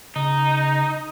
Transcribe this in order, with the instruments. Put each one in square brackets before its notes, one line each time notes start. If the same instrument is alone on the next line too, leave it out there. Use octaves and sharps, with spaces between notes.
[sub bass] C#3 [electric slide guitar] D#4